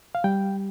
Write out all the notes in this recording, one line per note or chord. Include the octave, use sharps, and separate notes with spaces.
F5
G3 G5